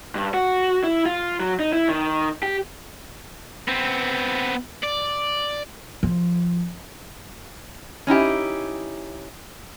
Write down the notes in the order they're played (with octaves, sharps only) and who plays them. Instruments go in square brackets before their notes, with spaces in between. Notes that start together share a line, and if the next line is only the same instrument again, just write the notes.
[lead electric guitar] G2
F#4
E4
F4
F#3
D#4
E4
D#3
G4
[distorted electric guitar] B3 C4
D5
[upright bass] F3
[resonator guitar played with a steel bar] C#4 D#4 E4 G4